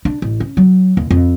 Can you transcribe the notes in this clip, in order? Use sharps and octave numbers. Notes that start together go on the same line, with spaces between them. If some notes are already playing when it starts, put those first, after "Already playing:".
D4
A1
C#4
F#3
D#2
F2